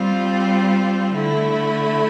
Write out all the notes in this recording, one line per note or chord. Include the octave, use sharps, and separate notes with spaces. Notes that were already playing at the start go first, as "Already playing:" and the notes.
Already playing: G3 C4 F4
D3 A3 E4